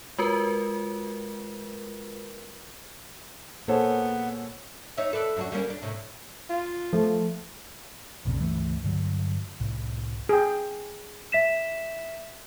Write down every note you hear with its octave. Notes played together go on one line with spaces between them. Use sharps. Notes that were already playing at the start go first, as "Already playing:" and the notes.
G#3 F4 F#4 A#4 B4
A#2 A#3 B3 G#4 A4 C5 C#5
D#4 C#5 E5
A4 B4 D5
F#2 D4 F#4
G3 A#3 C#4
D4
A2 C3
F4
F3 A3
B1 F2 A#2 C#3
G1 C#2 E3 A3
G2 D3 F#3
C2 A2
G#4 G5
E5 B6 E7